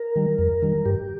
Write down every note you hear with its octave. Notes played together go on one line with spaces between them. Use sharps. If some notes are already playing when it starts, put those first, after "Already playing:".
Already playing: A#4
D#3 G3
F2
D#3 G3
G2 G4